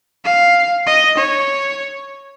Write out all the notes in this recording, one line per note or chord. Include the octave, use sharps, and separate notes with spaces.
F5
D#5
C#5